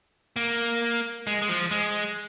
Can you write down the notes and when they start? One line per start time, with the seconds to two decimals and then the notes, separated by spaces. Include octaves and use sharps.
0.36 A#3
1.27 G#3
1.42 G#3
1.48 F3
1.71 G#3